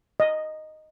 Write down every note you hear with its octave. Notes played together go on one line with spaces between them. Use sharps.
D#5